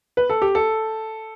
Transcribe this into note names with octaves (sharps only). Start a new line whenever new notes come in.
B4
A4
G4
A4